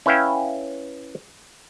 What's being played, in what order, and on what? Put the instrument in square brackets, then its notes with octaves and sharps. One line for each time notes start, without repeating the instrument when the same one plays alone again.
[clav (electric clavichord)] C#4 E4 B4 E5 F5 G5